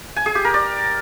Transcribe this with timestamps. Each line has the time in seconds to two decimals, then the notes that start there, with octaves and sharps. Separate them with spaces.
0.16 G#5
0.26 G#4
0.35 G4
0.45 A#4
0.54 D5